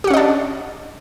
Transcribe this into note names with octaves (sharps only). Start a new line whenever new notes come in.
C#4 D4 G4 D#5 F#5